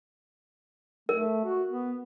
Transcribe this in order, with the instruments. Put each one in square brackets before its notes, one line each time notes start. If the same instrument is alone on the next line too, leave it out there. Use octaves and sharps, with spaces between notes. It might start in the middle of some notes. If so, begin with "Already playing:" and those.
[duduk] A3 [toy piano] A#4
[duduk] F#4
B3